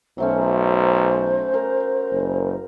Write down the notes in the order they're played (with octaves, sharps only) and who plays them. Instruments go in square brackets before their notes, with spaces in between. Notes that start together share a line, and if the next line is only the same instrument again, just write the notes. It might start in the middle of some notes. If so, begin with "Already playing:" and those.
[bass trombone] B1 [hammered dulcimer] F#3 A3 C#4 [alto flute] C5
[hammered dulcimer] A#4
[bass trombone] F#1